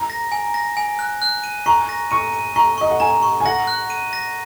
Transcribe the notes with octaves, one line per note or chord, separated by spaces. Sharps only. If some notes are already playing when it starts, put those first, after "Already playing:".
Already playing: A#5
A#6
G#5
A#6
G#5
F#6
F#6
D#7
A#5 C#6
A#6
C#6 D#7
D#7
A#5 C#6
D#5 C#6
F#5
G#5 A#5
C#6
G#5
F#5 A#6
F#6
D#7
A#6